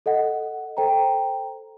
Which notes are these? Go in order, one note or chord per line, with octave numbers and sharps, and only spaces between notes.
A4 D#5 F#5
A4 C5 G5 A#5